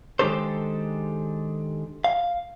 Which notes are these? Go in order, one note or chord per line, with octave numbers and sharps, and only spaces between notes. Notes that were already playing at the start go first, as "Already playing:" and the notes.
D#3 G#3 D4 G4 A4 C5
F5